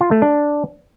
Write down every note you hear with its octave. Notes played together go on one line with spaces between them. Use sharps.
F4
A3
D4